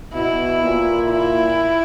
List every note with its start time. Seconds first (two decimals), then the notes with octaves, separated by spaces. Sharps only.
0.14 B2 E4
0.62 A#2
1.11 E4